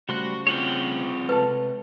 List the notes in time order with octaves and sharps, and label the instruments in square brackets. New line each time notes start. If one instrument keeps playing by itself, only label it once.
[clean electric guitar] C#3 A3 C5 [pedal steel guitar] G3 C6 F#6 [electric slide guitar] F#4
[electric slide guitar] C4 F4 G#4 [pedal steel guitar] C#5 F#5 G5
[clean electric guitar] C3 G#3 A4 [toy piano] B4 A5